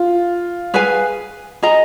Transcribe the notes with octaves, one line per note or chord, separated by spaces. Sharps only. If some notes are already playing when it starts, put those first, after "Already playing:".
Already playing: F4
G#4 B4 F5 G#5
G#4 D#5 A#5